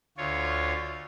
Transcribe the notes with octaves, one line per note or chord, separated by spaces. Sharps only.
D2 F4 C#5